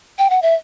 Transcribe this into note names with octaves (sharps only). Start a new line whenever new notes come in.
G5
F#5
E5